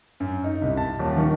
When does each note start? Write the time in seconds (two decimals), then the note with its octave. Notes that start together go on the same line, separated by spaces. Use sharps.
0.20 F#2
0.44 D#4
0.62 C2
0.77 A5
0.99 D#1
1.16 D#3